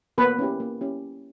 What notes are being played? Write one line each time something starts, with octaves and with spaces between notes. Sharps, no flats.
A#3 B3 B4
C#4 E4 G4
A#3
C#4 E4 G4